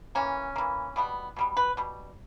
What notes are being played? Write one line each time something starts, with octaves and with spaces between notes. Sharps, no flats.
E3 A#3 C#4
E3 A#3
B2 G3 B3
B2 G3 B3
B4
B2 G3